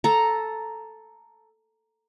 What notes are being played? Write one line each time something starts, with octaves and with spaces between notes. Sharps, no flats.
A4 A#5